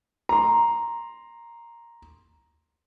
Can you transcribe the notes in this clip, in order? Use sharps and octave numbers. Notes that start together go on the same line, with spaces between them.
A#5 C6